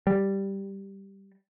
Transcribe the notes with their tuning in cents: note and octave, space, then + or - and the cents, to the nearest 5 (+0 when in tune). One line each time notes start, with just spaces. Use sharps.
G3 +0